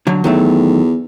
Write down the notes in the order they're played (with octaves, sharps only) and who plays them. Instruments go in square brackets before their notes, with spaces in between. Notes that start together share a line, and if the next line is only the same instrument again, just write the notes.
[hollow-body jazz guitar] D3 F#3
[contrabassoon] E2 [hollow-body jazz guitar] D#3 F#3 A3